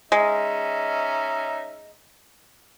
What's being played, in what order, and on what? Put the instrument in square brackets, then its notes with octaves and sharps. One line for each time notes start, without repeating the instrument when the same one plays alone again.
[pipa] G#3 [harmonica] C#4 D#4 E5